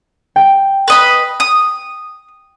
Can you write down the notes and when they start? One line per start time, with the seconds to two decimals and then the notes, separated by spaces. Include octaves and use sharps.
0.36 G5
0.88 B4 D#5 B5
1.40 D#6